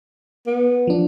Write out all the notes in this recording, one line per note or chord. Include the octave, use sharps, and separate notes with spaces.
B3
F3 D4